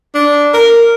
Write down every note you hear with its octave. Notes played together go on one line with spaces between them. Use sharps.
D4
A#4